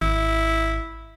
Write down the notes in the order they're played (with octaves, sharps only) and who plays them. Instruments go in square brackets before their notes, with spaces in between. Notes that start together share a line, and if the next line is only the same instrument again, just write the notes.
[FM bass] G#1 [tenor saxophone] E4